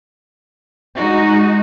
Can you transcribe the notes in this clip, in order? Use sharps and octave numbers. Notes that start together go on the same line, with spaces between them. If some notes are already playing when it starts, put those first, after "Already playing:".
G#3 D#4 F#4